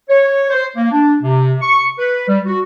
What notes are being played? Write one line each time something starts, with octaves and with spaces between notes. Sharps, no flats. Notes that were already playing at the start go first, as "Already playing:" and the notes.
C#5
C5
A#3
D4
C3
C#6
B4
G3
F#4